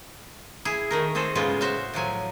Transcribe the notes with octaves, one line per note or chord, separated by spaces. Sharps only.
E4 G#4
D#3 A3 A#4
C4 G#4 A4 C5
A2 C#3 G#3 B3 C#4 F4
F#4 C5 E5 F5
A2 F3 F#3 G#5